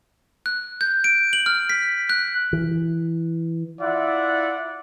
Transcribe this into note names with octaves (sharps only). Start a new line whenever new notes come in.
F#6
G6
D7
F#7
F6
B6
F#6
E3
E4 F4 D5 E5 F#5